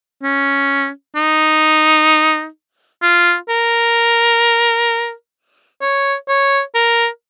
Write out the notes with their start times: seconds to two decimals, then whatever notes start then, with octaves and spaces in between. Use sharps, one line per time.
0.23 C#4
1.16 D#4
3.02 F4
3.49 A#4
5.82 C#5
6.29 C#5
6.75 A#4